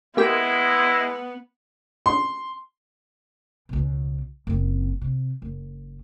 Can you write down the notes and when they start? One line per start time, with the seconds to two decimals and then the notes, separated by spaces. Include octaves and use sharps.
0.17 G#3 A#3 B3 E4 G4 G5
2.06 C6
3.69 C#2 B2
4.47 F#1 C4
5.01 C3
5.42 F#1